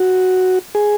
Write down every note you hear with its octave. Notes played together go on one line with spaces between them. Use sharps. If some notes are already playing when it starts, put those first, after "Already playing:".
Already playing: F#4
G#4